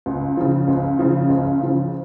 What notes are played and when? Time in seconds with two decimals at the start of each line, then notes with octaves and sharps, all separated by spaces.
0.06 C#2
0.37 C#3 F3
0.68 C#2
0.99 C#3 F3
1.29 C#2
1.60 C#3 F3